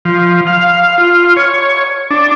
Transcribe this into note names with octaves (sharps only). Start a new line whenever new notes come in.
F3
F5
F4
C#5
D4